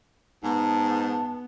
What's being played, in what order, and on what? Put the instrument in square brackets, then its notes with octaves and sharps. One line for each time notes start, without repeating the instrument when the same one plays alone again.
[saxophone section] G#2 [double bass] B3 [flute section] A5